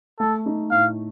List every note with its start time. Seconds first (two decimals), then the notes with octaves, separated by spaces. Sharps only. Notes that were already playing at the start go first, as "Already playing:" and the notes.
0.20 A3 A4
0.46 D#4
0.71 A2 F5